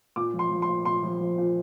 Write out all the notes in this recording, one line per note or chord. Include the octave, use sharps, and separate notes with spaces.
A#2 D6
F3
C6
F3
C6
A#2
A#2 C6
F3
F3
A#2